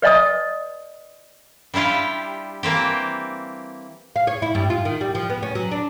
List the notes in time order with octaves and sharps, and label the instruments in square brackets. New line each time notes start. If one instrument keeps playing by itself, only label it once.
[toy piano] B4 D5 D#5 A5 D#6
[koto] G3 D4 E4 F4 G4
E3 A#3 C4 G4
[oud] F5
C#5
E4
G2
F4
D#3
G3
F3
B3
C#4
F#3
D4